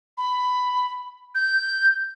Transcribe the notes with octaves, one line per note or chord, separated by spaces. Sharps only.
B5
G6